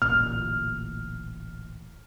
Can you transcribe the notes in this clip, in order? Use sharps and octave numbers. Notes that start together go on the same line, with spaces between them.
D1 A1 A#2 F6